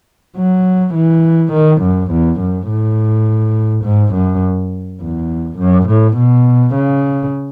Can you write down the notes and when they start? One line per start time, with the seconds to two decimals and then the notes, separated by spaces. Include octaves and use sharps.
0.37 F#3
0.95 E3
1.53 D#3
1.82 F#2
2.11 E2
2.41 F#2
2.69 A2
3.85 G#2
4.14 F#2
5.01 E2
5.59 F#2
5.89 A2
6.17 B2
6.75 C#3